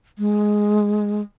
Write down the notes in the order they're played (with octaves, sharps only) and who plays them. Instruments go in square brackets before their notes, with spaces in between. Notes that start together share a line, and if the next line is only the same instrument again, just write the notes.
[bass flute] G#3